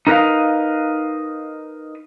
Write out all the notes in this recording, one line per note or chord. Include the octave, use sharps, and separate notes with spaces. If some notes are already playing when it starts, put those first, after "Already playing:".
D#4 A#4 B4 D#5 F5